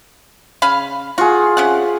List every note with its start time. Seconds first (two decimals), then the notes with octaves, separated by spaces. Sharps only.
0.62 C#3 F5 B5
1.18 F4 F#4 G#4
1.57 C3 C#4 F#5